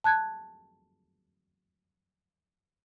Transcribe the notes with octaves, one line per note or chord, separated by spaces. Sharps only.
A5 F#6 G#6